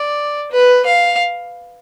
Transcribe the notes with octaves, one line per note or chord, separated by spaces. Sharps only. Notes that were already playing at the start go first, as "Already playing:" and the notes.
Already playing: D5
B4
F5